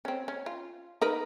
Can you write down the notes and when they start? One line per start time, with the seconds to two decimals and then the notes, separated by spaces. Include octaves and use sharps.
0.05 C4 C#4
0.28 C#4
0.46 F4
1.02 D#4 A#4 B4